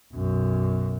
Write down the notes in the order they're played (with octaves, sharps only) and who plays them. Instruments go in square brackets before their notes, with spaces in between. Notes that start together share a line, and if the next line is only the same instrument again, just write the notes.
[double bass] B1 F#2